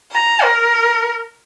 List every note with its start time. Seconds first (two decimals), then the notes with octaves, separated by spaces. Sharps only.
0.12 A#5
0.44 A#4